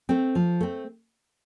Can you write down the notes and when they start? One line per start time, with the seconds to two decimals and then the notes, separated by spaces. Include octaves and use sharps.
0.09 A3 C4
0.35 F3
0.61 A3 C4